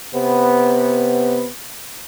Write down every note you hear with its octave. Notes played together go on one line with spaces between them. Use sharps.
C3 B3